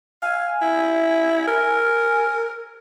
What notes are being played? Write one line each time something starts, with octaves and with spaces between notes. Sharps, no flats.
F5 G#5
E4
A#4